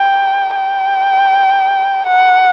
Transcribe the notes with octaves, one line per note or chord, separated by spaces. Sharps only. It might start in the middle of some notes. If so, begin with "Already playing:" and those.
Already playing: G5
G5
F#5